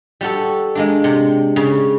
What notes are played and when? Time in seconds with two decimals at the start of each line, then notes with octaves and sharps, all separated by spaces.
0.21 G3 F#4 A4
0.75 G#3 A#3 D4
1.04 C3
1.56 C#3